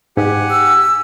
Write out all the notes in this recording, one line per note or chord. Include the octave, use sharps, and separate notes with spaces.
G#2 G4 F#5 G#5
E6